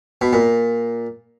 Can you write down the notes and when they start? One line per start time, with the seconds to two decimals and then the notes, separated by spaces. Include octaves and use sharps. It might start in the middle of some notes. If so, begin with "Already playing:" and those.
0.21 B2
0.33 A#2